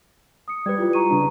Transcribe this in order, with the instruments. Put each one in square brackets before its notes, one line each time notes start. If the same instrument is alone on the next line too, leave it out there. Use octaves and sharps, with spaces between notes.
[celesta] D#6 C#7
[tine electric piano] G3 G4 B4 [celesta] G#6
[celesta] E4 F4
A#5 C#6 D#7
[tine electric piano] C#3 D4